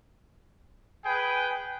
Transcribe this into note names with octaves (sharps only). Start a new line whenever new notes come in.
G#4 B4 G5